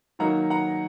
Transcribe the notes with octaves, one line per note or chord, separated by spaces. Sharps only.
D#3 F#3 A#3 D#4 F#5 A#5
F#5 A#5